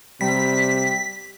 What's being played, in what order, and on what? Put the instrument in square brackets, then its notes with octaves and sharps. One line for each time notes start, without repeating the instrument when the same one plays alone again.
[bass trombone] C3 [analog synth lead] G3 [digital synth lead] B6